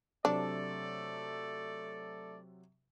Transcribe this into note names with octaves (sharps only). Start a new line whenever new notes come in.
C3 F#3 A3 D4 A4 C5 D5